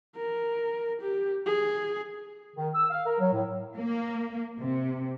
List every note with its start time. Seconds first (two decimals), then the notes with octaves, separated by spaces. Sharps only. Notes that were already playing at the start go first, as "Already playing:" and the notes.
0.16 A#4
1.02 G4
1.46 G#4
2.56 D#3
2.74 E6
2.90 F5
3.06 A#4
3.19 F#3
3.32 A2
3.77 A#3
4.58 C3